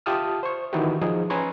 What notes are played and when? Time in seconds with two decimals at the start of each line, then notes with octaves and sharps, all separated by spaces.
0.06 F4 G4 E5 A5 D#6 F6
0.43 C5 C#6
0.73 D#3 E3 D#4 E4 F#4 G4
1.01 F3 D#4 G#4
1.30 C#4 B4 G#5 A#5 C6 C#6